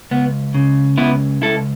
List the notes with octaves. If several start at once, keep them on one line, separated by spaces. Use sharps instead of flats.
C#2 B3
C#3
C#2 B3 E4
C#2 E4 A4